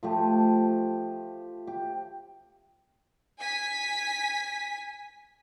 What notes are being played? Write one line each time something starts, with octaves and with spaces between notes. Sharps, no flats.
F3 A3 G4
G4
G#5 B6